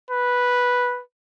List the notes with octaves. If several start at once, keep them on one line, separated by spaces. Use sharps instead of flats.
B4